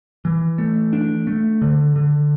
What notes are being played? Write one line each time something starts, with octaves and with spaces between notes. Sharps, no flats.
E3
A3
D4
A3
D3
D3